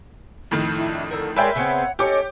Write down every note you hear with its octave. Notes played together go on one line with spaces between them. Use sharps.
F2 A2 D#3
D4 E4
D3 A4 A#4
G#3 A#4 B4 C#5 D5 E5 F5 G5
C#3 B3 C4 C#5 F#5
C#4 D#4 G4 A4 C#5 D#5 D6